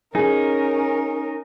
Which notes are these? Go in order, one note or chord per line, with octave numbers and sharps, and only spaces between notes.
C#4 D#4 G#4 A#4